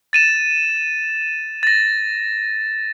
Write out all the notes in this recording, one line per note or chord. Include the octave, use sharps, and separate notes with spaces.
A6 D#7 E7
A6 A#6